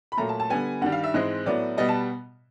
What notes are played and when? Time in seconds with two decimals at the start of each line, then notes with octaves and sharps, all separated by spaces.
0.12 B5
0.17 A#2 F#3 A3 A#5
0.29 A5
0.40 A5
0.50 D3 G3 B3 G#5
0.81 G2 D#3 G3 F#5
0.92 F5
1.04 E5
1.14 G#2 E3 G#3 C4 D#5
1.46 A2 F#3 B3 D5
1.77 B2 G3 B3 D#5
1.89 A5